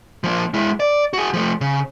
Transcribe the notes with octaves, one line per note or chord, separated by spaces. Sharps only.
F3 A#3
G#3 E4
D5
F#4 G#4
F3 A3
C#3